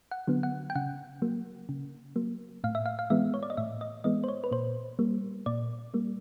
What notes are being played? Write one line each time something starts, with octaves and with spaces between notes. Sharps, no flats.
F#5
D3 F#3 B3
F#5
G5
C#3 F#5
F#3 A#3
C#3
F#3 A#3
A2 F5
E5
F5
F5
E3 G#3 B3 E5
C#5
D5
D#5
A2 E5
D#5
E3 G#3 B3 D#5
C5
C#5
B4
A#2 C5
G3 A#3
A#2 D5
G3 A#3